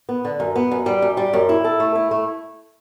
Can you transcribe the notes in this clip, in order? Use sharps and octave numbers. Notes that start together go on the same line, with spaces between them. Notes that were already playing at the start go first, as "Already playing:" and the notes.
B3
D3
F#2
B3
F#2
G3
F#2
G3
F#2
E4
A4
A3
E4
A3